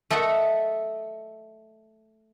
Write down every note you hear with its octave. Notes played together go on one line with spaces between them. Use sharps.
A3 A4 D#5 E5 F#5